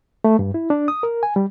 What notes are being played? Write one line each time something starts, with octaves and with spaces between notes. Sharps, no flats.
A3
G2
E4
D4
D#6
A#4
G#5
G3